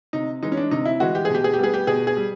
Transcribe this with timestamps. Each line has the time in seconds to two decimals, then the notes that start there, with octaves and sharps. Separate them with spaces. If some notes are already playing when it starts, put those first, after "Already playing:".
0.13 C3 D#4
0.43 E3 G#3 D#4
0.52 C#4
0.57 D4
0.71 C3 D#4
0.86 E4
1.00 E3 G#3 F#4
1.15 G4
1.25 G#4
1.30 B2 G4
1.44 G#4
1.54 G4
1.59 G3 B3 G#4
1.74 G4
1.87 B2 G#4
2.07 G#4
2.17 G3